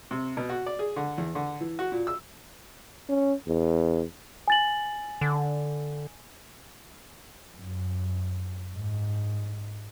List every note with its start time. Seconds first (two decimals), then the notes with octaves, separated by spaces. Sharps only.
0.11 C3
0.37 B2
0.49 F#4
0.66 D5
0.79 G#4
0.96 D3
1.18 E2
1.35 D3
1.61 E3
1.79 F#4
1.92 A#2
2.07 E6
3.09 C#4
3.47 E2
4.48 G#5 A6 F#7
5.21 D3
7.57 F#2
8.76 G#2